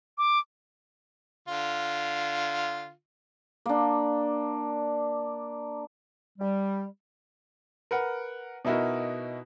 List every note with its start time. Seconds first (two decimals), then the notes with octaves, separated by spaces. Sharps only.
0.18 D6
1.48 D3 F4
3.66 A#3 D4
6.39 G3
7.91 A#4 B4 F#5
8.65 B2 D#4 E4 F#4 A#4